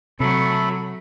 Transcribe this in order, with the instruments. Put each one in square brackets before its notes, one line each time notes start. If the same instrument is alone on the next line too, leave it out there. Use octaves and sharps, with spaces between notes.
[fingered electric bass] C3 [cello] F#3 [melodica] A3 A4 B5